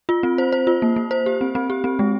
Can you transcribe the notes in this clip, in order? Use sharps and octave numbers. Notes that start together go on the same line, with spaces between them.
F4
C4
C5
C5
F4
A#3
A#3
C5
G4
C4
C4
G4
C4
G#3